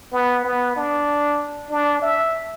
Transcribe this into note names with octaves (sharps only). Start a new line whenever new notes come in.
B3
B3
D4
D4
E5